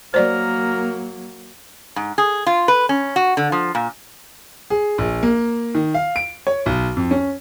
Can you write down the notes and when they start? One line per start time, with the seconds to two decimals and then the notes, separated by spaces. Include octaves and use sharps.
0.14 F#3 A#3 A#4 C5 D5
1.96 G#2
2.18 G#4
2.46 F4
2.68 B4
2.89 C#4
3.16 F#4
3.37 D3
3.52 F3
3.75 A#2
4.70 G#4
4.98 A#1
5.23 A#3
5.75 D#3
5.94 F5
6.16 D7
6.47 C#5
6.66 B1
6.96 F2
7.11 C#4